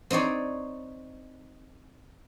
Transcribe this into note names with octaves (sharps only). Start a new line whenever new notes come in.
C4 D#4 C#5 D5